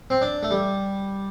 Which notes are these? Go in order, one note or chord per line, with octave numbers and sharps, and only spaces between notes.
C4
D4
A3
G3